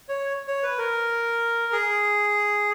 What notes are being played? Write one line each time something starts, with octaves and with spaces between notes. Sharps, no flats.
C#5
C#5
B4
A#4
G#4